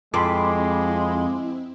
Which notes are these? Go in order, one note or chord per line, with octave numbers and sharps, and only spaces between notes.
F2 G#3 C4 E4 B5 C6 D6